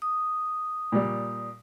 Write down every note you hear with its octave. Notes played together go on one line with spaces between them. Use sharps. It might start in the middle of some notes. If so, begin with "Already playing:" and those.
D#6
A#2 G3